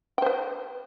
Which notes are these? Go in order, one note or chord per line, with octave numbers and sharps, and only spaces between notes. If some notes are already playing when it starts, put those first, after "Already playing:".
B4 C5 G5